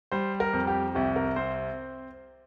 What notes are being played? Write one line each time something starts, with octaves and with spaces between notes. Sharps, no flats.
G3 C5
A#4
F2
G4
C2 G4
A#4
C4 C5